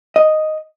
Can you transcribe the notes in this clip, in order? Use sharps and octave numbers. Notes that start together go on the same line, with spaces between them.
D#5